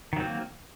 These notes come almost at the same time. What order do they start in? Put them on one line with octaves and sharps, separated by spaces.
D#3 F#3 C4 A#3